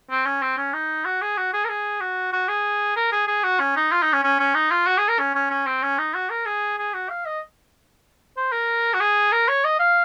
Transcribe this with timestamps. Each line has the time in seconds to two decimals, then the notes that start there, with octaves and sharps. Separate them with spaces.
0.10 C4
0.26 C#4
0.42 C4
0.57 C#4
0.73 D#4
1.05 F#4
1.21 G#4
1.37 F#4
1.53 G#4
1.65 A#4
1.69 G#4
2.01 F#4
2.32 F#4
2.48 G#4
2.96 A#4
3.12 G#4
3.27 G#4
3.44 F#4
3.60 C#4
3.76 D#4
3.92 F4
4.02 D#4
4.13 C#4
4.23 C#4
4.39 C#4
4.55 D#4
4.71 F4
4.87 F#4
4.98 G#4
5.08 A#4
5.19 C#4
5.35 C#4
5.50 C#4
5.66 C4
5.83 C#4
5.98 D#4
6.14 F#4
6.30 A#4
6.46 G#4
6.78 G#4
6.94 F#4
7.09 F5
7.26 D#5
8.37 C5
8.52 A#4
8.94 F#4
9.00 G#4
9.32 A#4
9.48 C#5
9.65 D#5
9.80 F5